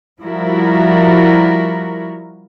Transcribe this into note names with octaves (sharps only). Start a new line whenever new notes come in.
F3 G3 E4 F#4 A#4